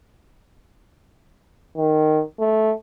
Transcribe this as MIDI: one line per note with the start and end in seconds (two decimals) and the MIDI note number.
1.77 2.23 51
2.39 2.73 57